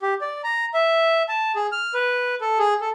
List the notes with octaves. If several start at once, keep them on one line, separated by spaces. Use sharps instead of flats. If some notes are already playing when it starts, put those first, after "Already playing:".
G4
D5
A#5
E5
A5
G#4
F6
B4
A4
G#4
A4